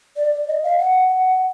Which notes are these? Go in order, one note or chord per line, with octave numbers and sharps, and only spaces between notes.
D5
D#5
F5
F#5
F#5